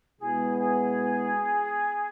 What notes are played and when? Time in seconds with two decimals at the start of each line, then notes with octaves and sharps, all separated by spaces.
0.19 B2 G#3 B3 E4 G#4
0.57 G#4